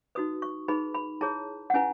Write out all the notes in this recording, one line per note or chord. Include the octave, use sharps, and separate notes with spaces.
D#4 F#4 B4 D#6
C#6
D#4 G#4 B4 B5
B5
E4 G#4 C#5 A5
F#5
C#4 E4 B4 G#5